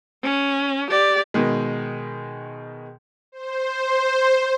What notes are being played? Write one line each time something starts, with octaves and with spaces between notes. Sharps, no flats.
C#4
G4 D5
B2 D#3 G#3
C5